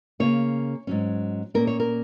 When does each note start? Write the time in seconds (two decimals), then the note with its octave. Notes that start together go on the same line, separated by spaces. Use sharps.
0.20 C#3 A#3 C#4 C#5
0.87 G#2 F#3 C#4
1.54 A#2 A#3 C#4 A#4
1.67 C#5
1.80 A#4